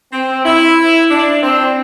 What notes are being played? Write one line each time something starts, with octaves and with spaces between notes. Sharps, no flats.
C4
E4
D4
C4